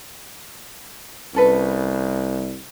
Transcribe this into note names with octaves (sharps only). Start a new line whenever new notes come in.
C2 C#4 A4 B4